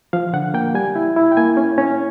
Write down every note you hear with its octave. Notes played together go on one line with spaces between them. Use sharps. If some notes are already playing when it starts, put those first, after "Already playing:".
F3 F5
D3 F#5
A#3 G5
G3 G#5
E4
E4
G5
A#3 G#5
C#4
C#4